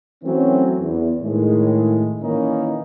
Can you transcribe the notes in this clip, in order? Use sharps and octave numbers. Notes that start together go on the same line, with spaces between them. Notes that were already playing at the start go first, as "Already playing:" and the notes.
E3 F#3 A3 C4 C#4
E2
A2 D#3 G#3
A#2 D#3 E3 A#3 C#4 D#4